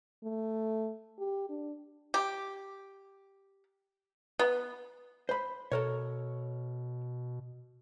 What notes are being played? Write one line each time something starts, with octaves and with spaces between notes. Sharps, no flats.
A3
G4
D4
G4
B3
C5 B5
B2 A4 A#4 C#5